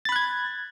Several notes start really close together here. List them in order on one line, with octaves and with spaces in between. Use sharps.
A6 B5 F#6 G#6